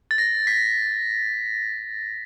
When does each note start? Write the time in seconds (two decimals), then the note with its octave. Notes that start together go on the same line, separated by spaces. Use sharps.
0.11 A6
0.18 A#6
0.47 B6